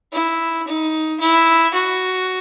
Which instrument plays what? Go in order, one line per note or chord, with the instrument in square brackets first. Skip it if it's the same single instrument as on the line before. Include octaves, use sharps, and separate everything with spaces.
[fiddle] E4
D#4
E4
F#4